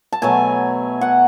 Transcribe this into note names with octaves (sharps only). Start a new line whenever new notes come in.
A5
B2 F#3 A3 G#5
F#5